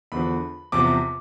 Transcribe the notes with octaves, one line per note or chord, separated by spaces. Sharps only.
E2 D3 F3 B5
E2 C3 F3 D6